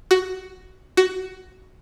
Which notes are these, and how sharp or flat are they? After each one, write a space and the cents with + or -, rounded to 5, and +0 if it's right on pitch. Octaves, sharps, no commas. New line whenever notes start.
F#4 +10
F#4 +15